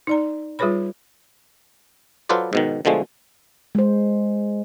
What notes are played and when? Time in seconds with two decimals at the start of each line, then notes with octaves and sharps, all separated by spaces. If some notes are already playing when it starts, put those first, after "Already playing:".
0.07 D#4 D5 A#5
0.59 G3 F4 G#4 B4 C#5 B5
2.29 F#3 F4 A4 B4 C5 D5
2.53 G#2 B2 D#3
2.85 B2 D3 F3 G#3 A3
3.75 G#3 C5